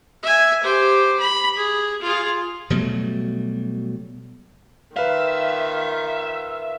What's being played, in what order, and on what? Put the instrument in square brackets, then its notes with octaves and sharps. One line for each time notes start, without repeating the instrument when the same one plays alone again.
[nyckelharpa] E5 G#5
G4 C5
B5
G#4
F4 G#4
[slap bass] B2 F#3 G3 A3
[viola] D#3 F4 [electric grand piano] B4 F5 [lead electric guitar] E5